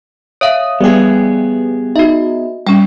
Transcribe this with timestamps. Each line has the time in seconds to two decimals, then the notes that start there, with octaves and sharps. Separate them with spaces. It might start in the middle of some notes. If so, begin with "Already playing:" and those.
0.41 C#5 E5 F5 D#6
0.81 G3 B3 G4 G#4
1.96 D#4 F#4 E5
2.67 G3 C#4 G5